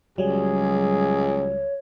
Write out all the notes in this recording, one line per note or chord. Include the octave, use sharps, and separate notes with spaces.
C#2 F#3 G3 G#4 C#5